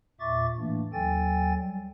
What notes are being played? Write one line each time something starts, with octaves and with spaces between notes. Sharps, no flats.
E2 A#2 E5 C#6 D6 A6
A2 E3 A3 A#3 D4
D#2 F#3 A4 G5 G#5 A6
G3